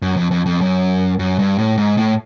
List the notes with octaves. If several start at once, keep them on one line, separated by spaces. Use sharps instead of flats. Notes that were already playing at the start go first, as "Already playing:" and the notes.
F#2
F2
F2
F2
F#2
F#2
G2
A2
G#2
A2